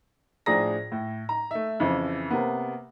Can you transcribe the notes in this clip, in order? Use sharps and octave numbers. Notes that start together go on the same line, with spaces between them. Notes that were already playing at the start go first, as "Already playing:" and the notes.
A2 F3 D4 G#4 A#5 A#6
A2
A#5
A3 E5
F2 C#3 E3
C3 A#3 B3